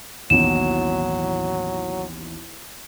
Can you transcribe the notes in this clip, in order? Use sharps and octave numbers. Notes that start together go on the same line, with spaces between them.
A1 D#2 B2 F#3 E7